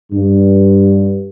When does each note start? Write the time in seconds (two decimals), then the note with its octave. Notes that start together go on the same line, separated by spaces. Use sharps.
0.12 G2